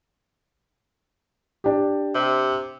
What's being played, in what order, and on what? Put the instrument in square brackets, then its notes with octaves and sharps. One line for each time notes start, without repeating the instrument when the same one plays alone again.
[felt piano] D4 G4
[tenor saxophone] C3